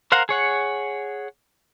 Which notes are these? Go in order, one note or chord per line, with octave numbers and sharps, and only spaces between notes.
A#4 C5 F5 F#5 A#5
G#4 C#5 F#5